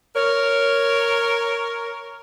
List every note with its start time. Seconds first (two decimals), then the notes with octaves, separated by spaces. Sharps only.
0.16 A#4 C#5